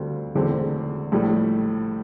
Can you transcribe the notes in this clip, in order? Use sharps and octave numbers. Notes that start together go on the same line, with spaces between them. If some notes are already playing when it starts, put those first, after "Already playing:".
Already playing: D2 D3 G3 C4 F4
E1 E2 D3 A3 C4
A#1 A2 G3